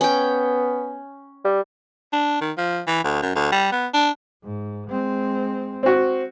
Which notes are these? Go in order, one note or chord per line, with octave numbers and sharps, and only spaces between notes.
B3 C#4 G5
G3
D4
D#3
F3
E3
D2
F#2
D2
G3
B3
D4
G#2
G#3 C4
C4 F#4